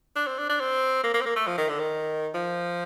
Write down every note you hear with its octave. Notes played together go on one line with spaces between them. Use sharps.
D4
C4
D4
D4
C4
A#3
A#3
C4
A#3
A3
F3
D#3
D3
D#3
F3